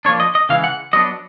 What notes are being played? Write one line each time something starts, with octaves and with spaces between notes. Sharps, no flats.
F3 A#3 D4 C#5
D#5
D#5
C#3 E3 G#3 F5
F#5
F#3 B3 D4 D#5